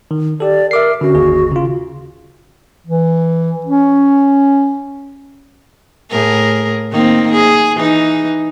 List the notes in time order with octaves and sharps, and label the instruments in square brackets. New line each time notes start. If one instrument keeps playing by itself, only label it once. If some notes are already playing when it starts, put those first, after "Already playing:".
[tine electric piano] D#3
[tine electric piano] G4 A4 [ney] D5
[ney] A#4 [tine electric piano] E5 D6 C7
[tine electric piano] D3 C#4 [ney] F#4
[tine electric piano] G1 D#2 G#4
C#3 F4
[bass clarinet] E3
C#4
[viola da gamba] A2 G#4 A#4
D#3 A#3 C4
G#4
E3 D#4